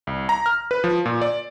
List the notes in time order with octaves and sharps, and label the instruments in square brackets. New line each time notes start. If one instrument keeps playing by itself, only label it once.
[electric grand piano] C2
A#5
F6
B4
F3
A#2
D5